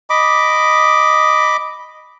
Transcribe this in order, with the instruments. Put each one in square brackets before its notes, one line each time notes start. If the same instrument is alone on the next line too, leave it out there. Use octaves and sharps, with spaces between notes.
[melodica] D#5 B5 D6